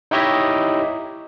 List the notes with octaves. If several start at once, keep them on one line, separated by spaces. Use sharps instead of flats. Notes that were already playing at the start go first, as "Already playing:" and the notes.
D#4 E4 G4 C#5 D#5 E5